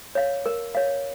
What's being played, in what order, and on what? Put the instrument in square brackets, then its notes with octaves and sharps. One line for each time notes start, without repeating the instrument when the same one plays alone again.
[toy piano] C#5 F5
A#4
C#5 F5